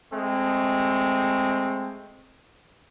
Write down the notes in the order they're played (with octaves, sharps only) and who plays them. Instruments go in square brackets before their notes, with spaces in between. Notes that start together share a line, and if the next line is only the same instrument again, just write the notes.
[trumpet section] G#3 A3 C4